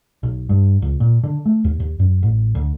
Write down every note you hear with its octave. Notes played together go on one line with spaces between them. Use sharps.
B1
G2
C#2
A#2
D3
A3
D#2
D#2
F#2
A1
D2